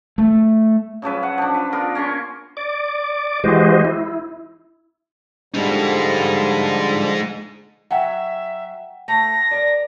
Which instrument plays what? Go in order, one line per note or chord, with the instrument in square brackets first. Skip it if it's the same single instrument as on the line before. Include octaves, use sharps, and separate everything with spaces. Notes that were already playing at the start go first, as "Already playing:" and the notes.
[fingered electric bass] A3
[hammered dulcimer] C#3 F3 F#3 B4
F#5
F3 D4
B4
B3 F4 A#4
A#3 C#4 C6 C#6
[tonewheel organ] D5 D6
E3 G#3 F#4 G4 C5 D#5
E4
[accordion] D3 F3 G3 [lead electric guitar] G#3 D#4
[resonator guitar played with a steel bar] F#3 [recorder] E5 [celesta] F#5 G5
[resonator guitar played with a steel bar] A3 [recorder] A#6
[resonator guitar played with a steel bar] A#4 D5